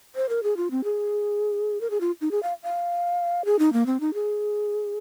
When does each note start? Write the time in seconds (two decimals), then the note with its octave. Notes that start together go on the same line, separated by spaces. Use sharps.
0.15 C5
0.29 A#4
0.43 G#4
0.57 F4
0.71 C4
0.84 G#4
1.81 A#4
1.90 G#4
2.01 F4
2.21 D#4
2.31 G#4
2.43 F5
2.63 F5
3.45 G#4
3.59 D#4
3.73 A#3
3.86 C4
4.00 D#4
4.14 G#4